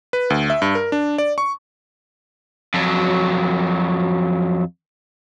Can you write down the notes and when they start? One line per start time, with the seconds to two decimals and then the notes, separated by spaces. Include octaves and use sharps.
0.13 B4
0.30 D2
0.50 E5
0.62 G2
0.75 A#4
0.92 D4
1.18 D5
1.38 C#6
2.74 F2 F#3